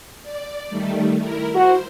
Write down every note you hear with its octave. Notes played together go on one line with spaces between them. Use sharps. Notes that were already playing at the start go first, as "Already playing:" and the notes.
D5
D#3 G3 A3
E4 A#4
F#4 C5